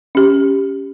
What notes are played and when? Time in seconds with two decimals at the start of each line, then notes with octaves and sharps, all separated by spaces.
0.15 C#4 G4